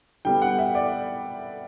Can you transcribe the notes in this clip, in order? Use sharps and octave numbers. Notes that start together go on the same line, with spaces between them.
D3 G3 B3 G5
F#5
E5
D5